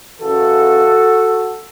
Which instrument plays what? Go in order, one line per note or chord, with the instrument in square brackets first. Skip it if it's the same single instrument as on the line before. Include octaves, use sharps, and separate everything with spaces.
[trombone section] F#2 C#3 E3 F#4 A4